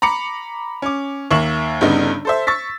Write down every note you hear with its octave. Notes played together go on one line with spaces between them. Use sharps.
A#5 B5 D6 C#7
C#4 D6
D#2 A#3 E5 C#6 E7 F#7
G1 G2 C#3 B3 D#4
A4 C5 E5
C#6 E6 A6 B6